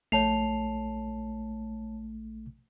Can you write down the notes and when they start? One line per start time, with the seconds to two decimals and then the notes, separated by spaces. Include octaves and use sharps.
0.12 A#1 A3 C#5 A5 C7 F7